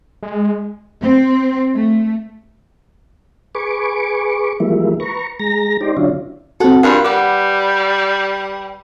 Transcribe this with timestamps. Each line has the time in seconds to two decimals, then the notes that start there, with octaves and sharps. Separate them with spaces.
0.23 G#3
1.02 C4
1.75 A3
3.55 G#4 B4 C#6 D6
4.60 E3 F3 G3 G#3 A#3 E4
5.00 B4 A#5 C#6
5.40 G#3 A#5 A#6
5.81 D#4 G4 C5 D5
5.97 D3 F#3 C#4 D4 E4 F4
6.60 C4 F#4 A4 F#5
6.83 G2 F4 A#4 F5 G#5 B5 D#6
7.04 G3 B4 F#5 D6